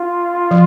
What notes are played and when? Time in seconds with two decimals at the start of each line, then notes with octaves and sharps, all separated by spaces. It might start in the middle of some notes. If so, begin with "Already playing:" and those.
Already playing: F4
0.51 F3